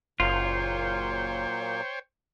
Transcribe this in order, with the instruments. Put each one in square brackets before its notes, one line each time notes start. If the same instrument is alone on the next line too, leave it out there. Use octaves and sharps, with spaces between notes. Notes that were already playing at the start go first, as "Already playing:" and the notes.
[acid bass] F#1 [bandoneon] A#2 F#3 A#3 [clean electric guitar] F4 [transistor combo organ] C5 C#5 G5